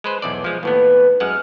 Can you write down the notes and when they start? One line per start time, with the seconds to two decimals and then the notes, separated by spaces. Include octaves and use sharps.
0.04 G#3 B4 C5
0.22 B1 E2 D5
0.44 F3 G#3
0.63 D#2 A2 B3 B4
1.20 F#2 G#3 F#5 F6